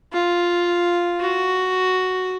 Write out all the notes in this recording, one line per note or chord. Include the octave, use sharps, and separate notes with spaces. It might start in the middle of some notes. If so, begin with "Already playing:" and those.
F4
F#4